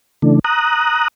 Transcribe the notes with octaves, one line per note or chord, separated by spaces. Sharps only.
C#3 E3 A3 D4
A#5 D#6 F#6